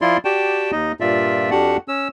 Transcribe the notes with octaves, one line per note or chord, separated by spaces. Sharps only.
F3 E4 F4 D5 C6
F#4 G4 D5 G5 A5
D#2 D#4 D#5
G2 A#2 F4 D5 E5
F2 D4 F#4 G4 F#5
C#4 E6